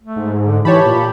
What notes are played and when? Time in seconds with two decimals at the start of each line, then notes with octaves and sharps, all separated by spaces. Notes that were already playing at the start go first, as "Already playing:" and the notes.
0.03 A3
0.16 G#2
0.46 D3
0.65 E3 G4 C#5 A5 B5
0.85 A#2